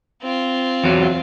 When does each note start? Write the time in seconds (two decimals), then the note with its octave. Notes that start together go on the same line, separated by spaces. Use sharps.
0.22 C4 F4
0.84 E2 F#3